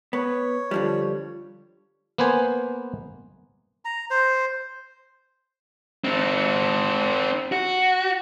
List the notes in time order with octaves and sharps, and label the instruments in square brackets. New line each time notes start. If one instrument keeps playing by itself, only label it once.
[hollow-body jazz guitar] B3 [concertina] C#5
[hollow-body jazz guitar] D3 F3 G3
[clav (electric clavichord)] A#3 B3 B4 C5 G#5
[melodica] A#5
C5
[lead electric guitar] C4 D#4
F#4